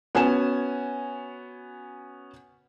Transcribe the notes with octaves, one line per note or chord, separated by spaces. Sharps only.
B3 C#4 F#4 G#5 E7